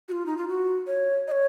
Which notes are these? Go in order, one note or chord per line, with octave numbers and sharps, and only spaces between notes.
F#4
F4
D#4
F4
F#4
C#5
D#5
C#5